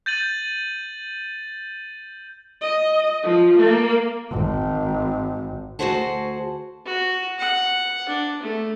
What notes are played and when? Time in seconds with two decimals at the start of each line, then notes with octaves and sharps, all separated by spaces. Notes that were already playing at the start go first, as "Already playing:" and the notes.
0.06 G6 A6 D#7 F#7
2.61 D#5
3.23 F3
3.57 A#3
4.31 G#1
5.79 D2 F#4 G#4 C5 F#5 A5
6.85 F#4
7.38 F#5
8.08 D4
8.42 A3